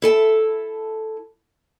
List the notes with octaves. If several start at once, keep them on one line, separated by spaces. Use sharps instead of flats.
E4 A4 G#5 A5